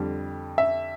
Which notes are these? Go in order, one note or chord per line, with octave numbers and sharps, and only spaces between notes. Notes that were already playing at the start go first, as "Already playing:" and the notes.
Already playing: F2 D3 G3
E5